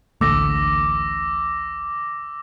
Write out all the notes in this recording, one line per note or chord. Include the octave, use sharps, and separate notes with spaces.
A1 D2 A3 D6 E6 A#6